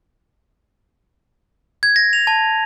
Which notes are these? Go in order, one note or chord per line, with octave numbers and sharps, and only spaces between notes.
G#6
A#6
F7
A5